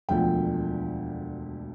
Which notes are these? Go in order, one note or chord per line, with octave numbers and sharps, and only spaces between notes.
E1 D2 D3 F3 G5